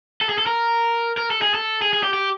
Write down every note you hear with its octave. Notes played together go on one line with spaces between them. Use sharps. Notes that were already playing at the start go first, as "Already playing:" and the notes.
A4
G#4
A4
A#4
A#4
A4
G#4
A4
G#4
G#4
G4
G4